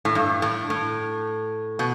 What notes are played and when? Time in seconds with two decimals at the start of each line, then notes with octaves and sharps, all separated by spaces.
0.05 A2
0.15 G2
0.42 A2
0.70 A2
1.79 B2